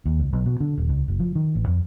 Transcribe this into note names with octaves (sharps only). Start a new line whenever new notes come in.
D#2
C#2
B1
B2
D3
D#1
C#2
F#1
F3
D#3
A1
F2